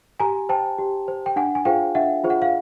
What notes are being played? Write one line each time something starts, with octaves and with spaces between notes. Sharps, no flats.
G4 G#5 A#5
C5 G5 A5
G4
C5
G5
D4 F#5 G#5
G#5
F4 G#4 C5 F5 G5
D4 E5 F#5
F4 G#4 C5
F#5
F5